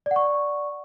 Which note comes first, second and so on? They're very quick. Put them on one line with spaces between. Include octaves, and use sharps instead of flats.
D5 F#5 C#6